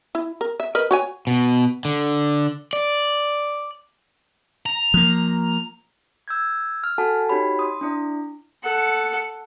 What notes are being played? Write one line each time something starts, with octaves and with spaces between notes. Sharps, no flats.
E4
A#4
E5
A#4 B4 D#5
F#4 C#5 G#5
B2
D3
D5
A#5
F3 A#3
E6 G6 G#6
F6
F#4 A4 F#5 G#5 A5
D#4 F#4 G4 C#5 B5
C6 D#6
D4 E4 D5
A4 F#5